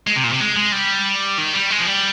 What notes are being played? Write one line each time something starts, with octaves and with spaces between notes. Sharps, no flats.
G#3
C3
A#2
C3
G#3
G#3
G3
D#3
G3
G#3
F3
G3